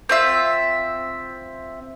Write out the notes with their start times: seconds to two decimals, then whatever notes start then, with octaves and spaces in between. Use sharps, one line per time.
0.09 C4 F4 E5